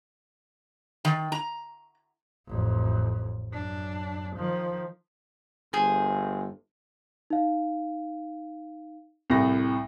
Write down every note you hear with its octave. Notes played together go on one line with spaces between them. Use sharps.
D#3
A#5
A1 F2
F#2 D4
D#3 F3
G1 G#4 C5
D#4 F5
C2 A2 A#6